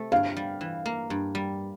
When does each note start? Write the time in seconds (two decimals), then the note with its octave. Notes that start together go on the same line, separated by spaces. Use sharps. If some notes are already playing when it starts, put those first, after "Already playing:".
Already playing: C3 A3
0.12 G2 F5
0.37 G3
0.61 E3
0.86 A#3
1.10 G2
1.35 G3